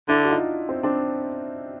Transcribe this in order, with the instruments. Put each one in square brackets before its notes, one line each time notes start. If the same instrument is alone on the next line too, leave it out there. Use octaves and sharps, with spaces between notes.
[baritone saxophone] D3 [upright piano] D4 E4
[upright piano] F#4
D#4 F4
C4
C4 D4